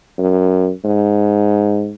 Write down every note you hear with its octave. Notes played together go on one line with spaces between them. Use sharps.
F#2
G#2